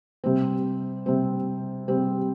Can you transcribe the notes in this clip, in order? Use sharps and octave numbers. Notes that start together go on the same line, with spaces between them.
C3 G3 C4
C3 G3 C4
C3 G3 C4